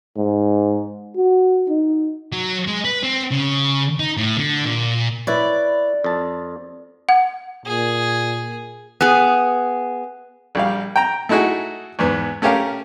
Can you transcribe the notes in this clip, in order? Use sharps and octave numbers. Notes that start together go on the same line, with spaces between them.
G#2
F#4
D#4
F#3
G#3
B4
C4
C#3
D#4
A2
D3
A#2
E4 B4 C#5 D5
F2 A5
F#5
A#2 G#4
B3 G#4
A#1 G3 F5
G5 A#5
A3 D#4 E4 F#4 G#4
E2 G#2 B3
A3 C#4 G4 A#4 F5